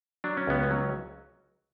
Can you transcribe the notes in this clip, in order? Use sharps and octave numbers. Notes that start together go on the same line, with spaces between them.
F#3 D4
C#4
C#2 B3
C#4
F#3